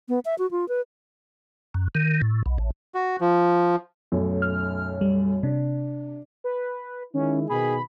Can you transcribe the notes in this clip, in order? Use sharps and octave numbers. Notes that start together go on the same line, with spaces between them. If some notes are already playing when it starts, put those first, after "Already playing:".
B3
E5
F#4
F4
B4
F#2
D#3
A2
B1
A1
F#4
F3
B1 F#2 A3
F6
G3
C3 D4
B4
D#3 G#3 C#4 E4
B2 D#3 G#4 B5